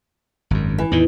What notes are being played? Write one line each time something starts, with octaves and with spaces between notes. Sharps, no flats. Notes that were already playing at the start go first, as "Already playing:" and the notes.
G#1 F#2
E3
E2 A2 D#3